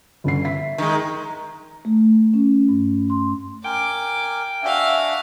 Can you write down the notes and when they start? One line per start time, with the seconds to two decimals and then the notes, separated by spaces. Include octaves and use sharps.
0.24 G1 C#4 C7
0.44 E5 B6
0.78 D#3 G#3
1.25 A#5
1.85 A3
2.34 C#4
2.69 G2
3.10 C6
3.64 A#4 G5 G#5 D6
4.63 D4 F#4 E5 F5 G#5